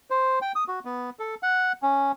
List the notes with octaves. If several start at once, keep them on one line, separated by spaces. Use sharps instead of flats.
C5
G5
D#6
F#4
B3
A4
F#5
C#4